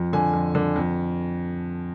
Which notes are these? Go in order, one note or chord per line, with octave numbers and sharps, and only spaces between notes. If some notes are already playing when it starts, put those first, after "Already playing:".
Already playing: F2
D3 G#5
F2
D3
F2